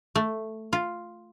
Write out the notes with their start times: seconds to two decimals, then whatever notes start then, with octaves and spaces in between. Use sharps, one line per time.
0.15 A3
0.73 F4